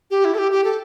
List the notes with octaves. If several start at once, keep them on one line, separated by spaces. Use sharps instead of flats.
G4
E4
A4
G4
G4
A4